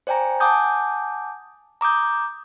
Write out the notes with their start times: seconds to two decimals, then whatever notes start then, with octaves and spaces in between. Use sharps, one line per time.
0.07 C5 D5 G5 G#5 A#5
0.40 F#5 G#5 A5 D6 D#6 G6
1.81 A#5 D6 D#6 G6